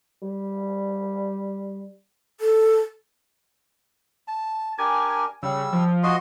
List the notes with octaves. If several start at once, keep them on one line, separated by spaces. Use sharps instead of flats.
G3
A4
A5
D4 G4 A#4 G#5
C#3 G3 E6
F3
F#4 D#5 C6